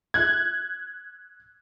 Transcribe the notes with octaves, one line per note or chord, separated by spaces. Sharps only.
F#6 G#6